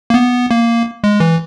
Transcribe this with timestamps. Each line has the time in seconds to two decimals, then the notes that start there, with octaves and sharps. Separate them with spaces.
0.10 A#3
0.14 B3
0.51 A#3
1.04 G#3
1.20 E3